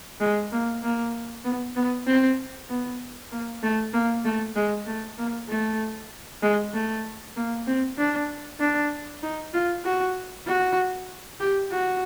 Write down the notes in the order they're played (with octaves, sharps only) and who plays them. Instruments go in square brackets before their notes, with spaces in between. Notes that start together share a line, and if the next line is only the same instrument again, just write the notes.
[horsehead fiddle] G#3
A#3
A#3
B3
B3
C4
B3
A#3
A3
A#3
A3
G#3
A3
A#3
A3
G#3
A3
A#3
C4
D4
D4
D#4
F4
F#4
F#4
G4
F#4